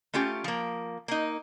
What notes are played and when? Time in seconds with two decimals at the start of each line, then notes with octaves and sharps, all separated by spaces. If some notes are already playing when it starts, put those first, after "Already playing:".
0.14 A3 C#4 F4 G4
0.44 F3 A#3
1.08 A#3 D#4